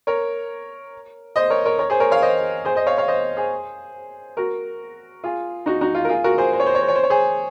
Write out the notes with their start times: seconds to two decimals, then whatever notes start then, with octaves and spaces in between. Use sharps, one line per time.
0.07 A#4 C#5
1.36 C5 D#5
1.50 A#4 C#5
1.65 A#4 C#5
1.79 A#4 C#5
1.90 G#4 C5
2.00 A#4 C#5
2.11 C#5 F5
2.22 C5 D#5
2.65 G#4 C5
2.76 C5 D#5
2.87 C#5 F5
2.98 C#5 F5
3.08 C5 D#5
3.37 G#4 C5
4.37 F#4 A#4
5.24 F4 G#4
5.66 D#4 F#4
5.81 D#4 F#4
5.95 F4
6.05 A#4
6.09 F4 G#4
6.24 F#4 A#4
6.38 G#4 C5
6.53 C5
6.60 C#5
6.66 C5
6.75 C#5
6.81 C5
6.88 C#5
6.95 C5
7.03 C#5
7.10 G#4 C5